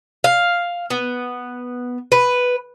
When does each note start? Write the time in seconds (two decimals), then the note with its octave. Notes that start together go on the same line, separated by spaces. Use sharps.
0.24 F5
0.90 B3
2.12 B4